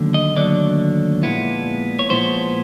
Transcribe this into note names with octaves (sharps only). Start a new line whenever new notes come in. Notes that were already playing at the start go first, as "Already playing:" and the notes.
Already playing: D#2 D3 F#3 A3
D#5
D#2 D3 F#3 A3 D5
A#2 F3 G#3 B3 E4
C#5
A#2 F3 G#3 B3 E4 C5